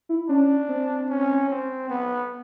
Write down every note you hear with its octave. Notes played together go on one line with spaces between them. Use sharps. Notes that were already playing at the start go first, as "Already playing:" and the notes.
E4
C#4 D4
C4
C#4
C4
B3